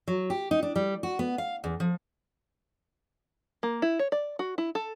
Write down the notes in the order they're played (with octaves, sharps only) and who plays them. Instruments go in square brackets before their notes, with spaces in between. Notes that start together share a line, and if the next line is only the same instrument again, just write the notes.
[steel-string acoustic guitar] F#3
G4
D#4
D4
G3
F#4
B3
F5
E2
F3
[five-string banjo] A#3
E4
C#5
D5
F#4
E4
A4